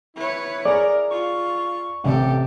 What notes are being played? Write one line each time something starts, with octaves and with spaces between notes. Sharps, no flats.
E4 B4 C#5
G#4 A#4 D5
F4 C#6
A1 C3 G4 A4